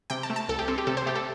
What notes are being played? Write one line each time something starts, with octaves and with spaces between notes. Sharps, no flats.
C3 G5
A5
A3
A5
C2 A4
G4
C4 A4
G4
C3 A4
C5
A3 G4
A4